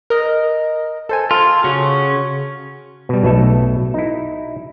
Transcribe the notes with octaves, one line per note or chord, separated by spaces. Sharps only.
A#4 D#5
A4 C5 G#5
F4 A4
C#3 C#4 F#4
B2 G3
B1 B2 A3 A4 E5
D#4 E4